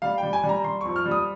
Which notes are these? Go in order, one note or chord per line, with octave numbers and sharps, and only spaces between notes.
G3 F5
G3 G5
G#5
G3
A#5
G3 C6
F2 C#6
F6
G3
D#6